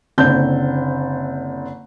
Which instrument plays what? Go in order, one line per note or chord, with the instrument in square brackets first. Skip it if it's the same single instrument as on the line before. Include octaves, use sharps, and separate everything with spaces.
[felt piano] F#1 D3 C4 A5 G6